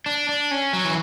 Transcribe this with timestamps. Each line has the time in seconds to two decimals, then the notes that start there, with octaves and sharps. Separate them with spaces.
0.06 D4
0.29 D4
0.51 C#4
0.73 F#3
0.85 E3